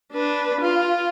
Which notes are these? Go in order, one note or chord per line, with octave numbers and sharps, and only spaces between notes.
D4 B4
F4